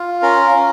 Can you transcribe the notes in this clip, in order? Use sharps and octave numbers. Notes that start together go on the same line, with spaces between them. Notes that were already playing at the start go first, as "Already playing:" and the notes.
Already playing: F4
C#4 A#4
C#4